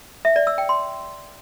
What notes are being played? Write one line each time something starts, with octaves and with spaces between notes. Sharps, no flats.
E5
D5
E6
G5
C6